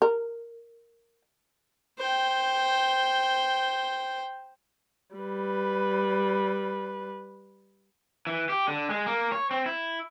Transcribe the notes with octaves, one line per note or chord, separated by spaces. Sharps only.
A#4
C5 G5
G3 B4
E3
G4
D3
G#3
A#3
C#5
C4
E4